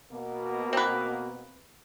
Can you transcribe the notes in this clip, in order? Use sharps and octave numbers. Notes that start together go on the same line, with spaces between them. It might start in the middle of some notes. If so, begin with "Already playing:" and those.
B2 A#3
C4 B4